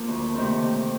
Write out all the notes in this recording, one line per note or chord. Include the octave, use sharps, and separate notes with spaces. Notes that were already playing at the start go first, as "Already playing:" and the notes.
Already playing: F3 A#3
D2
C3 D#3 A3 C4
C3